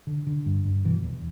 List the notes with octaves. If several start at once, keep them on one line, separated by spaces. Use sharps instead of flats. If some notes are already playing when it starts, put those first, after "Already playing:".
D3
D3
G2
G2
B2 E3
E2